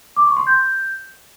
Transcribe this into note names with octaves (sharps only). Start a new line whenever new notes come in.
D6
C#6
C6
G6